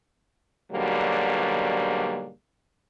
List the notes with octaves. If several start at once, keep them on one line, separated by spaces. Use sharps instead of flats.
G#2 B2 D3 F#3 G3 A#3